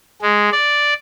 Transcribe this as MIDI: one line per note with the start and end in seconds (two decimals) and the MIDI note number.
0.22 0.49 56
0.52 0.94 74